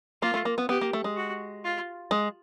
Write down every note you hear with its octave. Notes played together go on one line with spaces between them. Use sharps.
A#3 F4
A3
A#3
B3
B3 G4
A#3
A3
G#3
F#4
F4
G#3